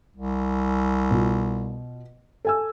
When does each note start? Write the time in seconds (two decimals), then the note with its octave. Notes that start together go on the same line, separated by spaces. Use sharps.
0.16 C2
1.11 B2 F4
2.45 A4 G#5 E6